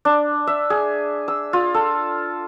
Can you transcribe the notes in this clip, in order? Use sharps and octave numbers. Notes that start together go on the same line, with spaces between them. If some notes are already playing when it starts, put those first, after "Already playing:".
D4
E5
G#4
E6
F4
A4